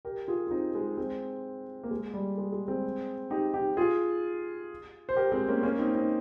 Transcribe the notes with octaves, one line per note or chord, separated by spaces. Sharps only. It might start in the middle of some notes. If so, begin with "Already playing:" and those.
G4 A#4
F4 G#4
F4
C4 D#4
G#3 C4
G#3 C4
A#3
G#3
G3
G#3
G#3
G#3 C4
D#4 G4
D#4 G4
F4 G#4
C5
G4 A#4
G#3 C4
A#3 C#4
A#3 C#4
C4 D#4
C4 D#4